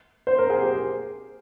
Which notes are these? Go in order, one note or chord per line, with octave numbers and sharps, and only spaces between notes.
C5
A#4
G#4
G4